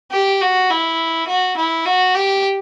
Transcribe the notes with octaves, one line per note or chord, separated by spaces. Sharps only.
G4
F#4
E4
F#4
E4
F#4
G4